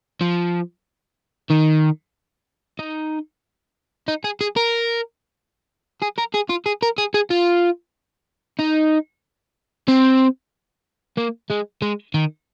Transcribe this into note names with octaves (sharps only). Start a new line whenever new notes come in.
F3
D#3
D#4
D#4
G#4
G#4
A#4
G#4
A#4
G#4
F4
G#4
A#4
G#4
G#4
F4
D#4
C4
A#3
G#3
G#3
D#3